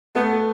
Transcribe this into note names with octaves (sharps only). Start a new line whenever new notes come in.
A3 B3